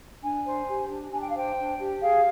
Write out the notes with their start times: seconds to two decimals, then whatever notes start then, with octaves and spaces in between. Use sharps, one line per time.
0.23 D4 G#5
0.46 C5
0.68 G4
0.90 D4
1.13 D4 G#5
1.21 G5
1.29 F5
1.35 C5 G5
1.58 D4
1.80 G4
2.02 G#4 F5